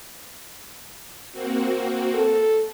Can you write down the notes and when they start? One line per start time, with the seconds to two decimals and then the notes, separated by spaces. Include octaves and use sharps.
1.32 A#3 C4 F#4
2.14 A4